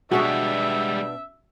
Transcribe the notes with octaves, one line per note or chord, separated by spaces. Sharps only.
B2 G3 G#3 B3 D4 F#4 G#4 E5